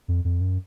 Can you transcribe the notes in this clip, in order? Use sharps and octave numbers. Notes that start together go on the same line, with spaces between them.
F2
F2
F#2